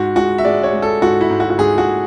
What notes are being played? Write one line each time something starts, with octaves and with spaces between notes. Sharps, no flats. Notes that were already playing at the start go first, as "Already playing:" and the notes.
Already playing: G#2 F#4
G#3 F#4
E5
G#3 D5
C#5
G#3
A4
G#2 F#4
E4
G#2
F#4
F#4
G#2 G#4
F#4